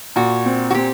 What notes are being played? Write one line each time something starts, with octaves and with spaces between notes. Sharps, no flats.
A#2 F#4
C4
F#4
C4 G4